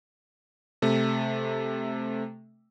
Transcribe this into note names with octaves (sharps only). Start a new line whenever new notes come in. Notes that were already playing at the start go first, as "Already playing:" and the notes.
C3 A3